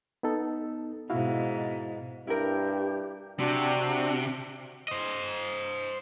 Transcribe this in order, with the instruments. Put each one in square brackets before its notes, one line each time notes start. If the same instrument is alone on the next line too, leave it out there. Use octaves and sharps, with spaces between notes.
[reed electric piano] B3 D#4 A4
[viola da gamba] G#2 B2 [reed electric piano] E4 F#4 F5
[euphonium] G2 [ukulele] E4 A#4 [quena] G4
[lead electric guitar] C3 [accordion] D4 F#4 G4
[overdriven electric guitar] C5 D#5